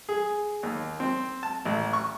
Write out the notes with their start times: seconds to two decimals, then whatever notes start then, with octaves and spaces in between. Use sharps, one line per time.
0.09 G#4
0.63 D#2
1.00 C4
1.43 A5
1.65 A1
1.93 C#6